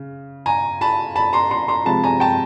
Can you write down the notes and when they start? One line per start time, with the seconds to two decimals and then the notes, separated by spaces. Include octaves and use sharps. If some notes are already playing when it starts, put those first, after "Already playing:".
Already playing: C#3
0.46 G#5 A#5
0.81 A5 B5
1.16 A5 B5
1.33 A#5 C6
1.51 A#5 C6
1.68 A#5 C6
1.85 C3 F3 G#3 A5 B5
2.04 G#5 A#5
2.20 G5 A5